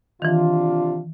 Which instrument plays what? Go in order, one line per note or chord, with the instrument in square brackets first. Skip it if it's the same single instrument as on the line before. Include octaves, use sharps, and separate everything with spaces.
[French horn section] C3 D4 F4 [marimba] D#3 E3